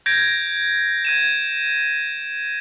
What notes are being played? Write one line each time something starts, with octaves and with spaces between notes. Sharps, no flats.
G6 G#6 A#6 D7
G#6 D#7 E7